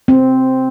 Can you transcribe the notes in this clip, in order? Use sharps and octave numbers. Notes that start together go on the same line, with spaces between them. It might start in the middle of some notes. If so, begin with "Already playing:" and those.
C4